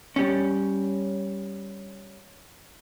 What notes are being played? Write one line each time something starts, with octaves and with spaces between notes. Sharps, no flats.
G3 C#4